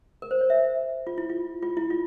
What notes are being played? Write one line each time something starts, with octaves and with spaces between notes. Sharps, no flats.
A#4
C5
C#5
E5
F4
E4
F4
F4
E4
F4